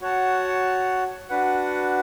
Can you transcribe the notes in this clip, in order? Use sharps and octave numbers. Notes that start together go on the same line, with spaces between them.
F#4 C#5 F#5 A5
D4 F#4 B4 F#5